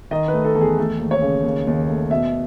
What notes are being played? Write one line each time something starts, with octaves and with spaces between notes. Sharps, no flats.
D#3 D#5
A3 B4
A4
E2 A4
G#4
A3 A4
D#2
C#5
C#3
D#2
D#2
A3
B2 E5